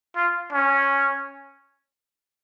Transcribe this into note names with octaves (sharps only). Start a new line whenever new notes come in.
F4
C#4